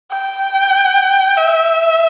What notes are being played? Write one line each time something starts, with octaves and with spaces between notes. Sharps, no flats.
G5
E5